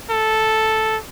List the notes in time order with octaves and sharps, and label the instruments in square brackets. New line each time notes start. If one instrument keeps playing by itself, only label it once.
[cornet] A4